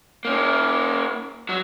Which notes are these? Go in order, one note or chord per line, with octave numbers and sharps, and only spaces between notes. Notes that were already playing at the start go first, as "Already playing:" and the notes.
A#3 C#4
F#3